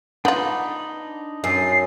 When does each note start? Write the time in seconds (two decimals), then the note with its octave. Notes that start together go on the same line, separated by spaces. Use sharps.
0.25 B3 D4 D#4 F4 B5
1.44 F#2 C7